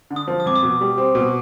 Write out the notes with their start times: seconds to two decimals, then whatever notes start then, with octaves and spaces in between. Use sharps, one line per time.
0.10 D3
0.16 D#6
0.28 F3
0.40 D#6
0.46 F2 D6
0.56 D#6
0.63 B2
0.81 G3
0.98 C4
1.15 B2